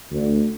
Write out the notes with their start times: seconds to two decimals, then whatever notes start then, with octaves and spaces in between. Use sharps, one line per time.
0.12 D2